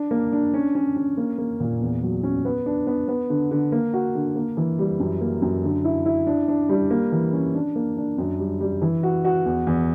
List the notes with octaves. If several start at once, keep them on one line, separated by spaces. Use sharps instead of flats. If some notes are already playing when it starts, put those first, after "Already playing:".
Already playing: D4
A#3
D4
C#4
C#4
C#4
A#3
A#3
A#2
E2
F#3
C#4
B3
D4
B3
B3
D3
D3
A#3
F#4
D3
A#3
E3
G3
F#2
A#3
F#2
D3
E4
E4
D4
D4
G3
A#3
E3
C#4
D4
A#3
D4
F#2
G3
G3
E3
F#4
F#4
E2
E2